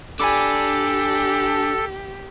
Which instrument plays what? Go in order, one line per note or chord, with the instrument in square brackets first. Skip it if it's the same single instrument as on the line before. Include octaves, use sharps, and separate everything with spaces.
[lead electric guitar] D4 D5 [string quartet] G4 [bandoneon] A4 [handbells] G#5 B5 D6